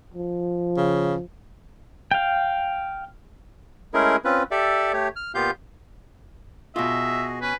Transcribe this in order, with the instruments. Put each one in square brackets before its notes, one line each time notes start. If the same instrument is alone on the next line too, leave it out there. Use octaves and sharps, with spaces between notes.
[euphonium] F3
[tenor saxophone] C#3
[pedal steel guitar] F5 G5
[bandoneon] G#3 A3 C#4 E4 G#4 A#4
C4 C#4 F4 B4
G4 A4 D5 E5
A3 G4 C#5
F6
A#2 B3 F4 G4 F5 G6
[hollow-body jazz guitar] B2 F4 [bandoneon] F#4 G#4 D#5 [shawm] E5
[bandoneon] C#4 G#5 [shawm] B4